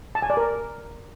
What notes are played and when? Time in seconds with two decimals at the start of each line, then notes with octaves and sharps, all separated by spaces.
0.15 A5
0.22 G#5
0.30 D5
0.37 A#4